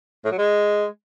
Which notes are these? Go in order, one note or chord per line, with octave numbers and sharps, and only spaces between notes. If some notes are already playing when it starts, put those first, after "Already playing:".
A2
F#3
G#3